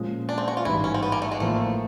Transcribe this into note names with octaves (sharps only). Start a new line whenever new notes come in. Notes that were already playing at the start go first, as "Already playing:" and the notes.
Already playing: A#2 F3 G#3 C#4
D4
C4
F#4
F4
A1 G#2 E3 G3 E4
C#4
C4
B3
A#3
A3
G#3
A1 A2 F3 A3 A#3